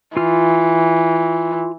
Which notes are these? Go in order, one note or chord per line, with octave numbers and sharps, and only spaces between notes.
E3 F4 F6